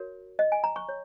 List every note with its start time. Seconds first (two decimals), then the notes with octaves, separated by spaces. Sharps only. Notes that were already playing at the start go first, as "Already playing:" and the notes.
Already playing: F#4 A#4 C#5
0.39 D#5
0.52 G#5
0.64 A#5
0.76 C#6
0.89 C#5